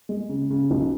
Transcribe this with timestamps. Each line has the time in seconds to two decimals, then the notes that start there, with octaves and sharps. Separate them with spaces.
0.09 G#3
0.29 C#3
0.50 C#3
0.71 B1